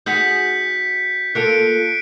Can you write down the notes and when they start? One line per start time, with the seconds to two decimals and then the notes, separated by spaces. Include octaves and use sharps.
0.06 D#4 F#4 G#4 G6 B6 C#7
1.35 A#3 F4 A4 F#6 C#7 D7